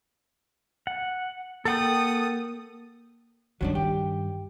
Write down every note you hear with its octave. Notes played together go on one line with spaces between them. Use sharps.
F#5
A#3 A4 F#5 G5 D#6
G2 D#3 F#3 C#4 D4
G4